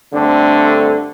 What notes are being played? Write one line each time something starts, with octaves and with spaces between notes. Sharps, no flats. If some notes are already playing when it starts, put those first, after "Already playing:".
G2 D3 A3 C4 D4